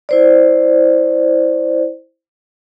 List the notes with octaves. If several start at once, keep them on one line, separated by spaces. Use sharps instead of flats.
E4 C5 D5